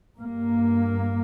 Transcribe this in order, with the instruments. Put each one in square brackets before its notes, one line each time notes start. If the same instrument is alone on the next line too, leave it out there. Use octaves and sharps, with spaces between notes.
[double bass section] G2 A#3